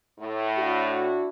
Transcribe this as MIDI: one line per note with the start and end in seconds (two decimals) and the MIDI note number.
0.20 1.15 45
0.58 1.29 62
0.58 1.29 64
0.58 1.29 66